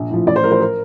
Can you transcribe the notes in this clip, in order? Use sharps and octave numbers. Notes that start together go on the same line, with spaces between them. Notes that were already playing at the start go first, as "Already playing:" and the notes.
Already playing: A#1
A2 F3
A1 D5
C5
A2 F3 A#4 C5
A#4